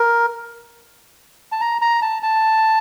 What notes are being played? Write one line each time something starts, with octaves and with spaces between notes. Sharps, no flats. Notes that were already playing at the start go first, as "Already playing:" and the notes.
Already playing: A#4
A5
A#5
A#5
A5
A5